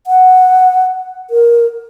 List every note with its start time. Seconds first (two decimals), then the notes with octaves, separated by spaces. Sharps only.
0.07 F#5
1.30 A#4